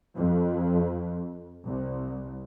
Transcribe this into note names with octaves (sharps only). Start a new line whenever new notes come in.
F2
C2